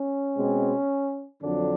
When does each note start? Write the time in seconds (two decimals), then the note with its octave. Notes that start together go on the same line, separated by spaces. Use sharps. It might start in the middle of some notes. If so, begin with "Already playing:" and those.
Already playing: C#4
0.36 B2 G#3 C4
1.42 F2 D3 F#3 D4